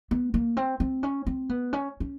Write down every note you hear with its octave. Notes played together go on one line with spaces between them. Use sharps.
B3
A#3
C4
C4
C#4
C4
B3
C#4
C#4